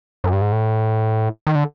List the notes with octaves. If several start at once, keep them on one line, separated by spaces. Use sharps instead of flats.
F#2
G2
G#2
A2
D#3
D3